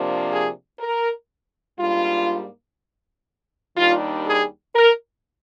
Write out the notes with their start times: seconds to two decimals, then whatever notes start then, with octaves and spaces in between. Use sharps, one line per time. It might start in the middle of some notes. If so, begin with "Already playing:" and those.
Already playing: C3 F3 A#3 D4
0.30 G#4
0.80 A#4
1.78 G#2 G3 A#3 D4 F4
3.76 D#2 D#3 G3 D4 F4
4.26 G#4
4.75 A#4